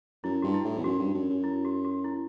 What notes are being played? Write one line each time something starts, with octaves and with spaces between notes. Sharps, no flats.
F#2 E4
G2 F#4
E4
A2
E2
F#2 F#4
G2
F#2
F#2
E4
F#4
F#4
E4